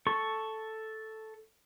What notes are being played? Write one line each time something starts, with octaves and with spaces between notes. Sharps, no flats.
A4 C#6